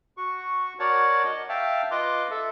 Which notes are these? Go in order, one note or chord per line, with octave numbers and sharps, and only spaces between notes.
F#4 C#6
F#4 A#4 C#5 D5 F#5 A5
D#5
E5 F5 G5 A5
F4 B4 D#5 C6 D6
A4 E5